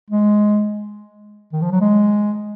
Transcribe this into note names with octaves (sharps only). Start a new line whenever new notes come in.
G#3
D#3
F3
F#3
G#3